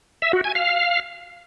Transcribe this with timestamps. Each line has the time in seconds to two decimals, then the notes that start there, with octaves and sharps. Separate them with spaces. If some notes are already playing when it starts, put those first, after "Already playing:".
0.22 E5
0.33 F#4
0.44 G#5
0.55 F5